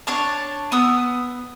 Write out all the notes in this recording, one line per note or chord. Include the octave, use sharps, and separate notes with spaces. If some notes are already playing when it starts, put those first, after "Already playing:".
D4 C#5 A5
B3 D#6 E6